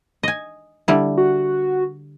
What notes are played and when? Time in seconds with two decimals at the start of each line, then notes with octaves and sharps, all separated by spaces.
0.23 D#5 G#5
0.88 D3 G3 E4
1.17 F#4